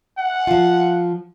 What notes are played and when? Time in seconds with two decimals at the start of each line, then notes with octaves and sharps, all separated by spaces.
0.18 F#5
0.47 F3 F4